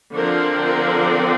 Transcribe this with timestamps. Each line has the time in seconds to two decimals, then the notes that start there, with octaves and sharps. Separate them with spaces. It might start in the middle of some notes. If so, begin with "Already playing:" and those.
0.15 D3 F3 C4 A#4
0.65 A#4